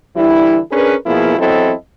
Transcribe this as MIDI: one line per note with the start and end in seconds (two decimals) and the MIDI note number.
0.17 0.59 50
0.17 0.59 52
0.17 0.59 55
0.17 0.59 64
0.71 0.95 61
0.71 0.95 62
0.71 0.95 68
0.71 0.95 70
0.71 0.95 71
1.06 1.38 47
1.06 1.38 53
1.06 1.38 58
1.06 1.38 59
1.06 1.38 64
1.06 1.38 68
1.39 1.72 40
1.39 1.72 54
1.39 1.72 60
1.39 1.72 64
1.39 1.72 69
1.39 1.72 75